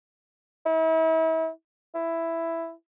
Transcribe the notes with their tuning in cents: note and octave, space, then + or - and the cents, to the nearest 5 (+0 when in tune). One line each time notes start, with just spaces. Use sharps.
E4 -40
E4 +5